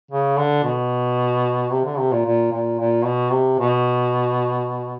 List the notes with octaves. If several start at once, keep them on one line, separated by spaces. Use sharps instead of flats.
C#3
D3
B2
C3
D3
C3
A#2
A#2
A#2
A#2
B2
C3
B2